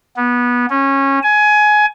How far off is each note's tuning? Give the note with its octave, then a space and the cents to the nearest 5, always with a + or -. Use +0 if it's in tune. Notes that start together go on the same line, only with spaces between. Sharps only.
B3 -20
C#4 -20
G#5 +20